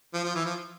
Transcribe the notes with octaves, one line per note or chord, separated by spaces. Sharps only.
F3
F3
E3
F3